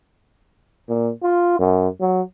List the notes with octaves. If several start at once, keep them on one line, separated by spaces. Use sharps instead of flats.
A#2
F4
F#2
F#3